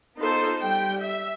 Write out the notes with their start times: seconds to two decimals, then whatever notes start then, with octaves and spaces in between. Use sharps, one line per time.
0.17 B3 D#4 F4 A4 C5
0.62 G3 G5
1.01 E5